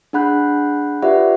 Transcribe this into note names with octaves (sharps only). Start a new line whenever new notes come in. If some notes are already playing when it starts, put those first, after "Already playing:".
D4 G#4 F#5 B5 F#6 G6
F4 G4 B4 D5 E5 F#5